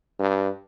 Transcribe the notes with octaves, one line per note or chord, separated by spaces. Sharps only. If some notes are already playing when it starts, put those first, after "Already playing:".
G2